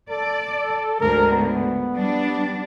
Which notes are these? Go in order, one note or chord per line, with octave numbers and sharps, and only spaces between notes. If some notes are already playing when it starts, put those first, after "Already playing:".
A4 D5
D2 G#2 A#4
B3
G3 D4